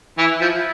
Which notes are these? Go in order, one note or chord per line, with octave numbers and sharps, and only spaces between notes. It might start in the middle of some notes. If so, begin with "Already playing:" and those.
E3 E4
F3